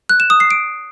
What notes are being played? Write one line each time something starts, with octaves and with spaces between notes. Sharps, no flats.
F#6
E7
D#6
C7
D7